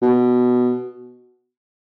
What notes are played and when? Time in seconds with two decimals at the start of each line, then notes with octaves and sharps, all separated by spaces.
0.02 B2